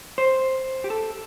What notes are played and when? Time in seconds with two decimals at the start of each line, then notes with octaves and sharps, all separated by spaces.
0.18 C5
0.84 G4
0.90 A4